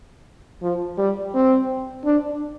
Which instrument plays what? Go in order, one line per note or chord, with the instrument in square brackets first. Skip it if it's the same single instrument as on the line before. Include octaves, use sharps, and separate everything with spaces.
[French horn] F3
G3
C4
D4